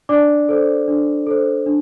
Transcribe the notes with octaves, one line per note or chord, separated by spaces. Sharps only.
D4 D5 D6
A4 C5
D4
A4 C5
D4